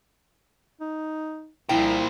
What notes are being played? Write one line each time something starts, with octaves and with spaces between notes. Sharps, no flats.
D#4
C2 A#2 F3 E4 G5